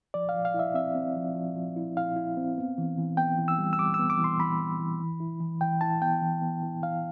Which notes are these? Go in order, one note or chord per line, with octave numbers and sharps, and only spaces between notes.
F3 D5
F5
F3
F5
E4
E5
C4 E5
C4
F3
F3
F3
E4
E4 F5
E4
C4
B3
E3
E3
B3 G5
E3
E6
G3
E6
G3 D6
B3 E6
D6
E3
C6
E3 B5
E3
E3
E3
E4
E3
E3 G5
E4 A5
B3 G5
E3
B3
E3
E3 F5